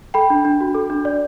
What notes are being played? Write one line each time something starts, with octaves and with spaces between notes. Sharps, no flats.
A4 G5 B5
D4
D4
F#4
A4
D4
D5